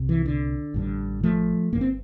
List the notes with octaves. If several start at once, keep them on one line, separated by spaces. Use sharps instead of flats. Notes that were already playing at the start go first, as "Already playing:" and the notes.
Already playing: C2 C3
E3
D3
A1 G2 D3
F3 A3
G1 G2 D3 A#3
C4